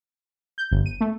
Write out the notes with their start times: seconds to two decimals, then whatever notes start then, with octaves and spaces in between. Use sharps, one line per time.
0.58 G6
0.71 G1
0.86 D#7
1.01 A3